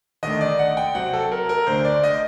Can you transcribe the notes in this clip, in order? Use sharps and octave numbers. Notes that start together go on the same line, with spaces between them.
D#2 D3 A3 D#5
D5
F#5
G5
C3 F#3 C4 F#5
A4
A#4
A#4
D2 D3 A3 D4 C5
D5
D#5